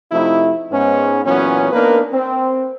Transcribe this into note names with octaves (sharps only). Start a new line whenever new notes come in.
C3 F3 A3 D#4 E4
G#2 B3 C#4
A#2 E3 F#3 B3 C#4
A#3 B3 D4 D#4 A#4 B4
C4